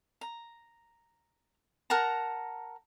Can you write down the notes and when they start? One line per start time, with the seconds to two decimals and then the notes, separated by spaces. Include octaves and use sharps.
0.21 A#5
1.90 A#4 F#5 A5 A#5